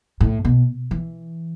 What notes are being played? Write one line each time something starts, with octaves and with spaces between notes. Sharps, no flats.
A2
B2
E3